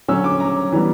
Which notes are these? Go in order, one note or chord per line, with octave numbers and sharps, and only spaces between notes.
D3 F#3 C#4 E6
D6
A#5
E3 G3 B3